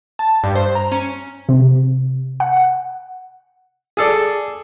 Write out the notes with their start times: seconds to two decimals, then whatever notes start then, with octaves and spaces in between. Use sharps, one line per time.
0.19 A5
0.44 G2
0.56 C5
0.75 A#5
0.92 C#4
1.49 C3
2.40 F#5
3.97 G#4 A4 D5